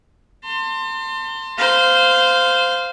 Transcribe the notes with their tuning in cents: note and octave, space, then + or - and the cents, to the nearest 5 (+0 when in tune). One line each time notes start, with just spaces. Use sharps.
A5 +40 C6 +0
C5 -15 F5 +0